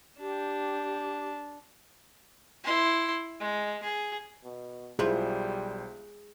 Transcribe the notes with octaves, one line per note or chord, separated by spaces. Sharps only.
D4 G4
E4 C6
G#3
G#4
B2
B1 G3 E4 F4 G#4 C5